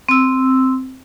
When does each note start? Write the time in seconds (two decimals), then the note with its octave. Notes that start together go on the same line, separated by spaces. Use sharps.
0.09 C4 E6